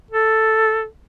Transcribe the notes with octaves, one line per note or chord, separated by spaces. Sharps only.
A4